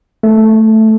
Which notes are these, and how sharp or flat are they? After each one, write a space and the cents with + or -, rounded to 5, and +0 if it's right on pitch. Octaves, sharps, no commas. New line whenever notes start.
A3 +0